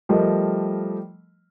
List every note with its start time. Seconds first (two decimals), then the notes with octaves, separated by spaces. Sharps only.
0.09 F3 G3 A3 G4 A#4 D#5